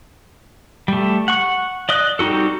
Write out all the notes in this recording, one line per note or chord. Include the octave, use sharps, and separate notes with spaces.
G3 A3
F#5 C#6
D5 D#5 D#6 F#6
G3 C4 D#4 F#4 A4